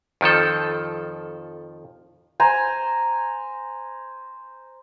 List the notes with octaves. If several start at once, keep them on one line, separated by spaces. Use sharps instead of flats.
F2 D#3 F3 A4
C5 G#5 A#5